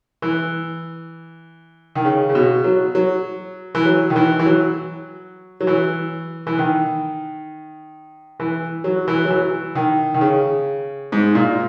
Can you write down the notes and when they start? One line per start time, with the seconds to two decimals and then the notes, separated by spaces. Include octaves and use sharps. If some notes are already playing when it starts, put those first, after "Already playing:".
0.22 E3
1.95 D#3
2.05 C#3
2.29 C#3
2.35 B2
2.64 F#3
2.95 F#3
3.75 E3
3.85 F#3
4.10 D#3
4.16 E3
4.39 E3
4.46 F#3
5.61 F#3
5.67 E3
6.47 E3
6.58 D#3
8.40 E3
8.84 F#3
9.08 E3
9.25 F#3
9.30 E3
9.75 D#3
10.14 D#3
10.21 C#3
11.12 G#2
11.35 A#2